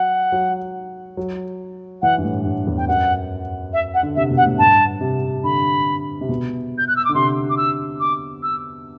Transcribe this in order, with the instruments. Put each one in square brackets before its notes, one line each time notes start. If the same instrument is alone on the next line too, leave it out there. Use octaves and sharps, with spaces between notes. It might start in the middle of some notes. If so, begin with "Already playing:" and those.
Already playing: [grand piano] F#3 [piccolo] F#5
[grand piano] F#3
F#3
[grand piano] E3 [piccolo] F#5
[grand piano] G2
A2
G2
E2
[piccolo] G5
[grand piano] F#2 [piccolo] F#5
[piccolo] E5
F#5
[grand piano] D3
[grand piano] C3 [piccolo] E5
[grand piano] B2
[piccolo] F#5
[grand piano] A2
[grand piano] G2 [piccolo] A5
[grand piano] C3
[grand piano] D3 [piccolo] B5
[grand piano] C3
B2
[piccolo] G6
F#6
E6
D6
[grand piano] D3
[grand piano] C3 [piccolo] C6
[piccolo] D6
E6
D6
E6